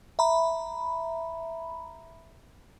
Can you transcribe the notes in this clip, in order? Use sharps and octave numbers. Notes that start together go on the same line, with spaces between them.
E5 A#5 B5